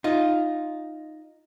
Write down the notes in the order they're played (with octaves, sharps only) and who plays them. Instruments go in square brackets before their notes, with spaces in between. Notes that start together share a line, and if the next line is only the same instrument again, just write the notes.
[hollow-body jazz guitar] D#4 F4